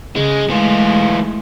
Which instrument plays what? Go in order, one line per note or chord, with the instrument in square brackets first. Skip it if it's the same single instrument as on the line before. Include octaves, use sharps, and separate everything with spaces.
[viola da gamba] C#3 [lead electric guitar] G#3
[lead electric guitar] E3 F4 [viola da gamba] G#3 A3